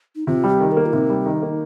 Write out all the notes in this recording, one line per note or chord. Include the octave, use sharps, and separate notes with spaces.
D#4
C3 F4
G3
G4
D#3
A#3 A#4
F4
C3 D#4
G3
D#3
A#3